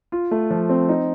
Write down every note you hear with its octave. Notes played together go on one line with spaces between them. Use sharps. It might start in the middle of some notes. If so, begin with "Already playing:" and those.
F4
A3
F3
C4
D#4